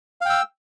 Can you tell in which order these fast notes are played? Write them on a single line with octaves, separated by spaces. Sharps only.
F5 G5 E6